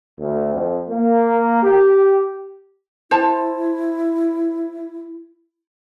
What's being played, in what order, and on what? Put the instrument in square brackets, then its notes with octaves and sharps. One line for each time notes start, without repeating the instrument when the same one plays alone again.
[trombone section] D2
F2
A#3
G4
[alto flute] E4 [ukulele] C5 A5